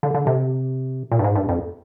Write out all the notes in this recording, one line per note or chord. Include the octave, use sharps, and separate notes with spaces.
D3
D3
C3
A#2
G2
G#2
G2
F2